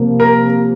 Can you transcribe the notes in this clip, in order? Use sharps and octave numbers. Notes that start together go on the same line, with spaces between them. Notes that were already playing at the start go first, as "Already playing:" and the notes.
Already playing: C3 F3 A#3
A#4